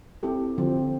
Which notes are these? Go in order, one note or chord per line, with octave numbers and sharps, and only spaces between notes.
C4 E4 G4 A4
D3 F3 C4